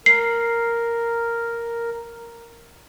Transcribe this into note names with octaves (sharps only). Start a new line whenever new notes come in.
A#4 C7